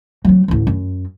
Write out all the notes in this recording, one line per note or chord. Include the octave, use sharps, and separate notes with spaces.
F#3 C4
A1 D2
F#2